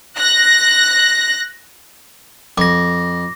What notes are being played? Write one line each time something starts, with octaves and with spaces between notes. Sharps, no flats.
F#6 A#6
F2 D6 A#6